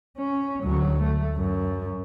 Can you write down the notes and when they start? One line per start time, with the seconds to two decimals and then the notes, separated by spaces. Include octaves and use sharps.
0.18 C#4
0.64 D2 F#3
1.02 A3
1.37 F#2